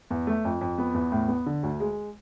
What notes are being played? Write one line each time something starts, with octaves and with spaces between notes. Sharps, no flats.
E2
A3
F2
F2
B3
E2
A2
B3
D3
D2
G#3